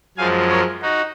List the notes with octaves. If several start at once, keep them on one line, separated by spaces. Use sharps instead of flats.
F#2 F3 G#3 F5 G#5
A#4 C#5
D#4 F#4